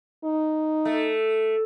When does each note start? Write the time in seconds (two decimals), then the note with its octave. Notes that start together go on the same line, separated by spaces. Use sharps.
0.24 D#4
0.85 A3